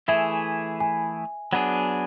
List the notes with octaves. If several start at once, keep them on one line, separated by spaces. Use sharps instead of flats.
E3 A3 E4 G#4 E5
G#5
F#3 B3 D4 G#4